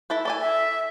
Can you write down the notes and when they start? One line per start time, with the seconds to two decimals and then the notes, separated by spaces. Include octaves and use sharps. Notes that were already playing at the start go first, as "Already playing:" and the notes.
0.10 E4 A4 B4
0.25 A4 D5 G#5
0.40 E5